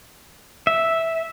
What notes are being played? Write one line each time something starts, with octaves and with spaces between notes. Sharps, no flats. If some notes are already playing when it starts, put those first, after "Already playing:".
E5